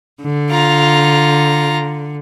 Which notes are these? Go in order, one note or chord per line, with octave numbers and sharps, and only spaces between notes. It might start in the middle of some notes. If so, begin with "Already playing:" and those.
D3
F4 A#5